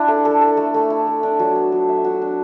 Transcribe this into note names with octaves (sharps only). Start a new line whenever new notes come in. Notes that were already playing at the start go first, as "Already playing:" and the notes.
Already playing: D4 E4
A4
A4
A4
A3
A3
E4
A3
D4
F#3
B3
F#3
E5
F#4
D4